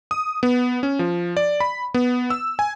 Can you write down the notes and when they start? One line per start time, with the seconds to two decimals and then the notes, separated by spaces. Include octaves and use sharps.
0.11 D#6
0.43 B3
0.83 C#4
0.99 F3
1.37 D5
1.60 B5
1.94 B3
2.30 E6
2.59 G#5